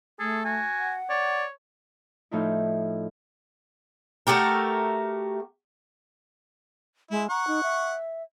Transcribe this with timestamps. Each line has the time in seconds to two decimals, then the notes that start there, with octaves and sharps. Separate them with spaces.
0.20 A3 G#4 A4
0.45 F#4 G#5
0.77 F#5
1.10 C#5 D5
2.31 A2 F3 D#4 E4
4.27 A3 F#4 G4 A#4
7.11 G#3 E4
7.30 F#5 A#5 C#6
7.47 D#4
7.63 E5